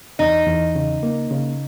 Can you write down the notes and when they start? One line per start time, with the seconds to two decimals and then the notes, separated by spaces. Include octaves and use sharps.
0.19 E2 D#4
0.47 E2
0.75 C#3
1.03 A#3
1.31 C#3